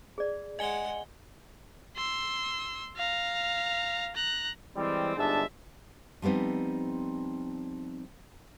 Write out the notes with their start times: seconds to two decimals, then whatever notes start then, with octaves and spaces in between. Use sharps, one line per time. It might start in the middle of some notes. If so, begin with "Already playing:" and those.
0.18 G#4 D5
0.59 G#3 D#5 F#5 G#5 G7
1.97 C6 E6
2.97 F5 A#5
4.15 A#5 F#6
4.76 E3 G3 G#3 C4
5.17 G1 G#2 G#3 D4 E5 A5
6.22 F3 G3 B3 C4 D#4